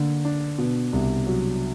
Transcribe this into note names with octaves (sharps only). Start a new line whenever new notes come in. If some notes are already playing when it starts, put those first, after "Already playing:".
Already playing: D3 A#3
D4
B2
C2
F#3